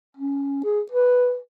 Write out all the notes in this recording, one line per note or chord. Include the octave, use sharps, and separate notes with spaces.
C#4
G#4
B4